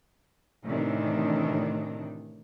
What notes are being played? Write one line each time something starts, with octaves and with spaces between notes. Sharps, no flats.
A2 C3 D#3 E3 D4